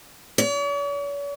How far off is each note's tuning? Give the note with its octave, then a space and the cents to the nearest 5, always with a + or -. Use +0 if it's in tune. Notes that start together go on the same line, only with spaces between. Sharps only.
C#5 +45